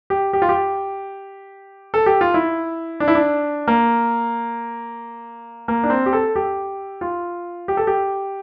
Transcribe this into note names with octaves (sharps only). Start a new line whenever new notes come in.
G4
G4
F4
G4
A4
G4
F4
E4
D4
E4
D4
A#3
A#3
D4
C4
G4
A4
G4
F4
G4
A4
G4